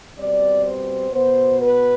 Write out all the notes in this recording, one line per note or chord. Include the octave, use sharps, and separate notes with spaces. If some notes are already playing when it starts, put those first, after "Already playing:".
B2 G3 C4 D5
C5
B2 B3 C5
B4